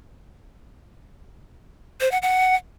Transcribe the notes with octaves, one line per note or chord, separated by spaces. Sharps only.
C5
F#5
F#5